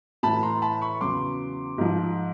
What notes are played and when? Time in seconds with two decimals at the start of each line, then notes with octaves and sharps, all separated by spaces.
0.23 A2 E3 A5 B5
0.43 A#5 C6
0.62 A5 B5
0.81 B5 C#6
1.01 E2 C#3 F#3 C6 D6
1.78 G#2 F3